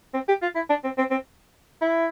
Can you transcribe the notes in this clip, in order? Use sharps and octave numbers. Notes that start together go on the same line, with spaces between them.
C4
G4
F4
E4
D4
C4
C4
C4
E4